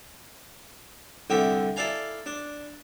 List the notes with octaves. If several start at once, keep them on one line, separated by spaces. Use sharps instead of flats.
C2 D3 G4 E5
E4 A4 D5 F5 G#5 A#5
D4